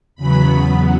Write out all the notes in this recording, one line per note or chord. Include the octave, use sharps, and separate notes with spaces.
E2 C#3 F#3 B3 B5